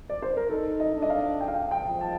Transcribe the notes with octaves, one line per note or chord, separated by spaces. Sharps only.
D5
C5
A#4
D#4 A4
D#5
D4
D#5
F5
G5
F5
G5
G5
F3
A5